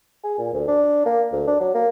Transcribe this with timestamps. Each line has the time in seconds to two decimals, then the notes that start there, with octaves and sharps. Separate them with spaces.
0.24 G#4
0.38 A#2
0.53 D2
0.67 D4
1.05 A#3
1.32 D2
1.47 D4
1.60 F#3
1.74 A#3